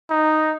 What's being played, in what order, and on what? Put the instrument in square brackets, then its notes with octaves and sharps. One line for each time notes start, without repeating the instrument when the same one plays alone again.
[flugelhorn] D#4